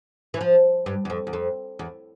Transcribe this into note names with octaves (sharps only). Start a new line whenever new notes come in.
E3
F3
G2
E2
F2
E2
F2
E2